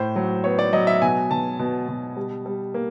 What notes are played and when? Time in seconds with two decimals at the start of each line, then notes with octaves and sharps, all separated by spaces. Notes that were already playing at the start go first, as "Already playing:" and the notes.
Already playing: A2 C5
0.16 F#3
0.44 B3 C#5
0.59 D5
0.73 F#3 D#5
0.87 E5
1.02 B2 G#5
1.31 B2 A5
1.59 B2
1.88 B2
2.17 G3
2.46 G3
2.74 A#3